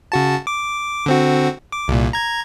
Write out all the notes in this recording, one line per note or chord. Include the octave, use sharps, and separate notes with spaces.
C#3 F#4 A5
D6
D3 C4 F#4
D6
C2 A#2
A#5 G#6